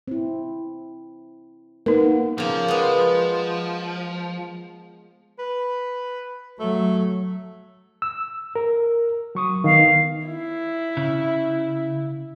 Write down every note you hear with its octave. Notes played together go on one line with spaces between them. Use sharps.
C4 E4
A#3 B3 D#4 A#4
C#3 F3 A#3
G#3 B3
B4
F#3 A3
E6
A#4
F#3 C#6 D#6
D#3 B3 F5
E4
C#3